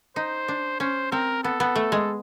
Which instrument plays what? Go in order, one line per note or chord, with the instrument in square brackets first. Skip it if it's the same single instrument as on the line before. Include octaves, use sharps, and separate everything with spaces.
[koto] D#4 [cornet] C5
[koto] D4
[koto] C#4 [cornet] C5
[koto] C4 [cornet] A#4
[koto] B3 [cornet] A4
[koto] B3
A3
G#3